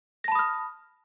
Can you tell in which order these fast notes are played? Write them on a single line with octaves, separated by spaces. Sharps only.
A#6 A5 B5 D#6 F6